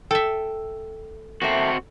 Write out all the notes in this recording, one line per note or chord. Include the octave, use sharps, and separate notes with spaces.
A4 E5 G5
A3 A#3 C4 F#4